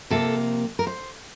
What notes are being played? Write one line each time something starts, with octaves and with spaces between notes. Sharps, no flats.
C3 F3 A#3 A4
A#4
C5